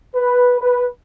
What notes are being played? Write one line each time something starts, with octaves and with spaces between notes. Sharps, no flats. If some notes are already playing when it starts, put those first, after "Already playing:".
B4
B4